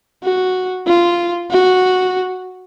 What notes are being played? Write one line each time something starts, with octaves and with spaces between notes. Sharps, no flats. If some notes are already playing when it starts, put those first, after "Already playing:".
F#4
F4
F#4